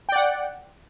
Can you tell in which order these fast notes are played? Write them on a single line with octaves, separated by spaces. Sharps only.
G5 D5 F#5